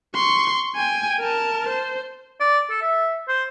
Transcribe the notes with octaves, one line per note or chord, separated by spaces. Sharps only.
C6 C#6
G5 G#5
A#4 A5
C5
D5
A4
E5
C5